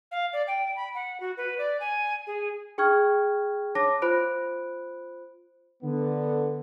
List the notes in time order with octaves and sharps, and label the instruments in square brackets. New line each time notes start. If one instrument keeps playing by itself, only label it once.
[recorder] F5
D5
G5
B5
F#5
F#4
B4
D5
G#5
G#4
[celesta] G#4 G5 C#6 F6 G#6
C#5 A5 D6 A#6
F4 C5 B5 F#6 D7
[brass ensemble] D3 B3